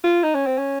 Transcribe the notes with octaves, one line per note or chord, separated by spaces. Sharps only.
F4
D#4
C#4
C4
C#4